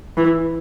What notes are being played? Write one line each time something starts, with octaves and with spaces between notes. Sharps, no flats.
E3